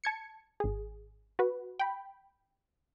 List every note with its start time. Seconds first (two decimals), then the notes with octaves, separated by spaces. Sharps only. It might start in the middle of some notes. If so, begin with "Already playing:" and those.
0.04 A5 G#6 C#7
0.60 G#1 G#4
1.39 F#4 B4
1.79 G5 B5